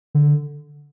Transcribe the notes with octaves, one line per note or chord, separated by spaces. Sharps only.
D3